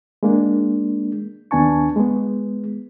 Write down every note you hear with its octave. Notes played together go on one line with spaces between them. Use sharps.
G#3 A#3 D4
D#2 B3 D4 G#5 A5 C#6
G#3 B3